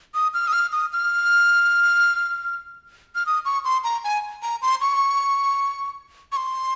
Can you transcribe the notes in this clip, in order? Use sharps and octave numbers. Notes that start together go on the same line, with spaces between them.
D#6
F6
D#6
F6
D#6
F6
F6
D#6
C#6
C6
A#5
G#5
A#5
C6
C#6
C#6
C6